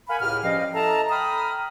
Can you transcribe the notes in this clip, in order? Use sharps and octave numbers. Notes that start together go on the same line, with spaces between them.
A#4 F5 F#5 G#5 B5
C#2 A2 G4 F6
G2 F3 C#4 D#5 F5 G5
E4 A4 D#5 A5 A#5
G5 A#5 B5 D#6 F6